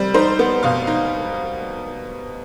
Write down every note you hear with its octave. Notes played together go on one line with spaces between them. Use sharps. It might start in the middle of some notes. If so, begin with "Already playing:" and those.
Already playing: G3 C4
D#4 C5
B3
B2 F5
D#4